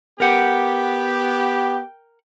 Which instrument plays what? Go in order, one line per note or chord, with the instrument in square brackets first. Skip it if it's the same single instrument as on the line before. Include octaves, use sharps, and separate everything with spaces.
[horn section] B3 G4 [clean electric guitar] A#4 F#5 [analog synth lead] G5